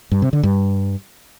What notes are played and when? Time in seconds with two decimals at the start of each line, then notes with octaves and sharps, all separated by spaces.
0.11 G2
0.22 C3
0.33 D3
0.43 G2